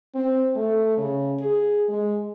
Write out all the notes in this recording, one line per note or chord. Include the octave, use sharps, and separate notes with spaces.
C4
A3
C#3
G#4
G#3